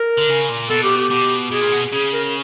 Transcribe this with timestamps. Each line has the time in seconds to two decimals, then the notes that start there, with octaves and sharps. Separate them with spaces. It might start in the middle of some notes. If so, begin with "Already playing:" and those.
Already playing: A#4
0.18 D3
0.29 C#3
0.49 A#2
0.70 B2 A4
0.83 G4
0.97 G4
1.10 B2
1.51 B2 G#4
1.61 A#2
1.72 B2
1.92 C#3 G#4
2.13 A#4